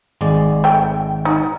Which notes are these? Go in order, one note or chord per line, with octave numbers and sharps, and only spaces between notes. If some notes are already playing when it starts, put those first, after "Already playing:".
G#1 G#3 D5
A3 G5
D#4